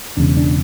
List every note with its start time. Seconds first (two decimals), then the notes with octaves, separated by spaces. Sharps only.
0.17 E1 E2 C#3 D4
0.37 D4